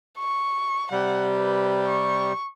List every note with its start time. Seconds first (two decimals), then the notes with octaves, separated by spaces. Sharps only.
0.18 C#6
0.92 C3 G3 F#5
1.35 B4
1.87 C#6